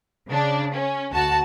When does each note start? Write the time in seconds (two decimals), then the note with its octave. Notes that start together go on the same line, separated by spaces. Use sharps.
0.29 C#3 D4
0.74 C#4
1.12 D2 F#4 A5